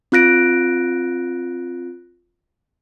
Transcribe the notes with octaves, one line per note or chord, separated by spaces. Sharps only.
C4 F4 F#6 A#6 D7